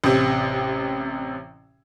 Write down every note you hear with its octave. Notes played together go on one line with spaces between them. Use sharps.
A1 C3